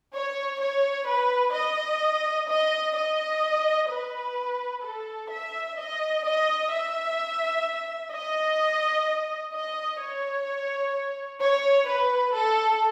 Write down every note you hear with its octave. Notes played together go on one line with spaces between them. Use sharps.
C#5
C#5
B4
D#5
D#5
D#5
B4
A4
E5
D#5
D#5
E5
D#5
D#5
C#5
C#5
B4
A4